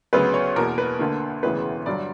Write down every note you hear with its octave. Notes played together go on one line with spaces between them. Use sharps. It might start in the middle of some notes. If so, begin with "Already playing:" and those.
D2 C#3 F#3 B3 B4
C#5
E2 B2 A#3 A#4
B4
D2 D3 A#3
E1 D2 C#3 E3 B3 B4
G1 G2 F#3 D5